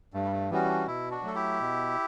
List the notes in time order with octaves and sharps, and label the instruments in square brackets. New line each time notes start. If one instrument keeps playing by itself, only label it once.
[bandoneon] G2 [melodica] A3
[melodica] G3
A3
[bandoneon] E3 G3 C#4 F#4 [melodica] B3
[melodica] D4
[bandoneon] B2 [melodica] E4
[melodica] D4 F#4
[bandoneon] F#3 A3 [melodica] A4
[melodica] E4 G4
[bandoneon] B2